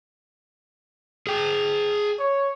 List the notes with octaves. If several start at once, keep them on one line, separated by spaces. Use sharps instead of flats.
G#4 G5
C#5